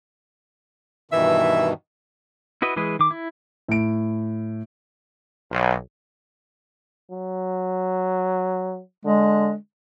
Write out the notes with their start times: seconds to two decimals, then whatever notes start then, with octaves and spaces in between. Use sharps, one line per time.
1.11 G2 B2 D#3 E3 E5
2.62 E4 F#4 B4 D#5
2.76 E3 G#3 G#4 B4
2.99 D#3 D6
3.11 E4
3.68 A2 D7
5.51 B1
7.11 F#3
9.05 D3 G#3